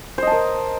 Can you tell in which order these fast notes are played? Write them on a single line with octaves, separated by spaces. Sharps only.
C5 D#5 A5 A#4